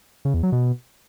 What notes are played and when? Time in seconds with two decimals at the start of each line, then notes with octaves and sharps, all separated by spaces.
0.25 C#3
0.34 E2
0.43 F#3
0.52 B2